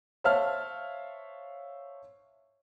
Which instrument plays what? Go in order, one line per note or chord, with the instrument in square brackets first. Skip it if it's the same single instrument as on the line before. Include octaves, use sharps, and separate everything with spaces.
[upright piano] C5 C#5 E5 F5 A5 F6